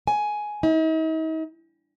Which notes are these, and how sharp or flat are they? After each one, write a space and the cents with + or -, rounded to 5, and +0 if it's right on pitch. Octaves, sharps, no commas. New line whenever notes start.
G#5 +10
D#4 +45